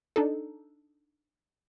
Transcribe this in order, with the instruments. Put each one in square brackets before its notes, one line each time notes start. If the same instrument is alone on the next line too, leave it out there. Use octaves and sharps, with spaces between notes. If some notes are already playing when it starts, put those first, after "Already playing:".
[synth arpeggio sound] D4 D#4 A4